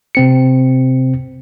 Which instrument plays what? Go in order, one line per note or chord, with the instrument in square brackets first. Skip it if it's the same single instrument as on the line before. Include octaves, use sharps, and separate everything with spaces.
[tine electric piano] C3 C4 C#7